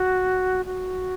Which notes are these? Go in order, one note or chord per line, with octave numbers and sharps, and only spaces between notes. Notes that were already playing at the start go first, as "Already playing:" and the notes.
Already playing: F#4
F#4